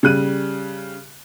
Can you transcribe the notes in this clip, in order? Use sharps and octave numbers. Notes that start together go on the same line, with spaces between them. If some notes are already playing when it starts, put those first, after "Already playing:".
C#3 G3 F#6 D#7